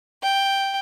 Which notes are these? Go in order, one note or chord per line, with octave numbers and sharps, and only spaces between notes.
G5